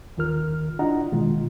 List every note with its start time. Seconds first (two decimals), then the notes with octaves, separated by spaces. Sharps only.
0.17 D#2 D#3 F4 A#4 F6
0.79 D4 E4 F4 D#5 F#5 A#5
1.12 B2 D#3 G#3 F4